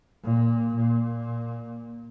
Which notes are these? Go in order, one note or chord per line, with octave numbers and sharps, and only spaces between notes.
A#2
A#2